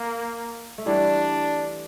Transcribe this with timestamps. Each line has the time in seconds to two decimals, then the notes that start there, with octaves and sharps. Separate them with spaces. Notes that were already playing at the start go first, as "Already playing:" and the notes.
Already playing: A#3
0.78 A3
0.86 E3 G3 D4